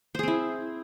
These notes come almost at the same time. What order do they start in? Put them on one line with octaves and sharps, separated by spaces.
C5 G#4 C4 E4